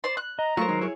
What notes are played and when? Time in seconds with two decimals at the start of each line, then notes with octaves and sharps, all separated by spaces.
0.04 C5 D5 C6
0.17 F#6
0.39 D#5 A#5
0.57 F#3 A3 F4 A#4 C5 C#6
0.69 D#3 G#3 D#4
0.81 E4 G#4 C#5